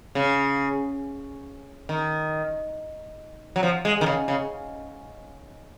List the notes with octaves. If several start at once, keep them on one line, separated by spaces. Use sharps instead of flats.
C#3
D#3
F#3
F3
G#3
D#3
C#3
C#3